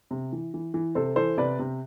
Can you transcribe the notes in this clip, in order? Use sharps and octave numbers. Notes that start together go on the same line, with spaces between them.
C3
E3
E3
E3
C3 A4 C5
E3 A4 C5
C3 B4 D5
C3